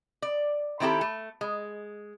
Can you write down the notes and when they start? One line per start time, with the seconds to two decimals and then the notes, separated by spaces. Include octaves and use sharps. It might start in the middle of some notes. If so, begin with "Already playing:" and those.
0.22 D5
0.80 D#3 C4 E4 G4 A4
1.01 A3
1.41 G#3